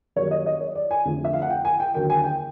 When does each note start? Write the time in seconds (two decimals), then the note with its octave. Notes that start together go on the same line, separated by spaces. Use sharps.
0.16 F#2 D#3 G3 A#3 C#5
0.31 D#5
0.46 D#5
0.61 C#5
0.75 D5
0.91 G#5
1.06 F1 F2 D3 F3 A3
1.25 E5
1.33 F5
1.42 F#5
1.50 G5
1.65 G#5
1.80 G5
1.94 D#2 D3 F#3 A#3 G5
2.10 G#5
2.24 G5